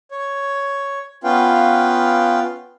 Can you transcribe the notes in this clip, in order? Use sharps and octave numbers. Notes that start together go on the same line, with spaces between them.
C#5
B3 C#4 F4 B4 F5 G5